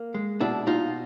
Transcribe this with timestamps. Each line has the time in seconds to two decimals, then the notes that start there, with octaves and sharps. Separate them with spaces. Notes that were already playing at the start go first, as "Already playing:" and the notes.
Already playing: A#3
0.14 G#3
0.41 B2 D4 E4
0.67 B2 D#4 F4